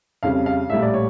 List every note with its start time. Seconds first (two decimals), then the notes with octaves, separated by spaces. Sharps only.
0.23 F2 C#3 G3 F5
0.46 F5
0.70 A#1 A2 G3 A#3 E5
0.82 D5
0.94 C#5